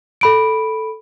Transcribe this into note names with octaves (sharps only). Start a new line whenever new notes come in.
A4 B5 D7